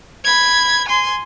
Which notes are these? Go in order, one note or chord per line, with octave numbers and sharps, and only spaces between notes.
B5 G#6
G#5 C6